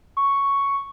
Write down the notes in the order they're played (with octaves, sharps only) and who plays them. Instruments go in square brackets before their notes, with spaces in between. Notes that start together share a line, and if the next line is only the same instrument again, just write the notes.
[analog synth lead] C#6